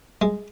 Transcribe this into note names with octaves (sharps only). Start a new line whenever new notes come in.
G#3